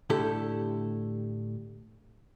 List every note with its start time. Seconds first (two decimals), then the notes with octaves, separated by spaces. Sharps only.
0.10 A2 D3 A3 E4 G4 A4